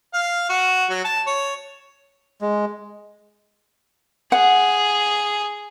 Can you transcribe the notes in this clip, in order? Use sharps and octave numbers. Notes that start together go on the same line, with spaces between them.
F5
F#4
F#3
A5
C#5
G#3
G#4 F#5